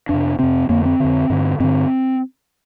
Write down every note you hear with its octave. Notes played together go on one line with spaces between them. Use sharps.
F2 C3 D4
F2 C3 C4
F2 D3 A#3
C4
F2 D3
G2 D3
G2 D3 C4